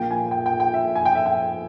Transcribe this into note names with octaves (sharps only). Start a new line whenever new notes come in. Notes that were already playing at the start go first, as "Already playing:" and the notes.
Already playing: A#1 A#2 A#3 G5
G#5
G5
G5
G5
E5
G#5
G5
E5
G5